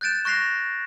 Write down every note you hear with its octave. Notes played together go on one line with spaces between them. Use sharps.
F#6 G6 A6 D7 E7
C#6 F#6 A#6 C7 F7